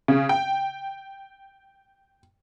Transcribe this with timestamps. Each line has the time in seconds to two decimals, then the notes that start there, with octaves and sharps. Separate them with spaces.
0.08 C#3
0.29 G5